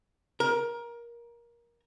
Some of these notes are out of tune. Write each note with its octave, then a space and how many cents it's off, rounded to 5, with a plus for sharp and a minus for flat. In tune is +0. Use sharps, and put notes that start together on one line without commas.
A#4 +20